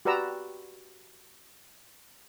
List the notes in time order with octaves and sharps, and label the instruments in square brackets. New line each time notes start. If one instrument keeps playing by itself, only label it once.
[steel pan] F#4 G4 B4 D5 A#5 E6